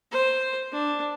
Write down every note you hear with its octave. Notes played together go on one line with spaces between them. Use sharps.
C5
D4